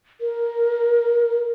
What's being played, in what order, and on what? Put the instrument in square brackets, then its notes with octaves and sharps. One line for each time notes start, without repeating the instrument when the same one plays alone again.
[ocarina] A#4